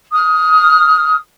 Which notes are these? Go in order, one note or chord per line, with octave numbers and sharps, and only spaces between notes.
D#6 F6